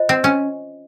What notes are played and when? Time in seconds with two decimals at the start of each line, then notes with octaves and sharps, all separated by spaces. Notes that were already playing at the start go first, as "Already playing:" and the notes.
Already playing: F4 C5 D#5
0.09 C4
0.24 C#4